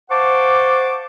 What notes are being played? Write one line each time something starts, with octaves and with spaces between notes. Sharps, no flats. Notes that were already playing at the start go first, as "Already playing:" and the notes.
C5 F5 F#5 A5 C#6 D6